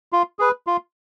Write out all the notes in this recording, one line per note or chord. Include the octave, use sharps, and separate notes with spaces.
F4
G#4 B4
F4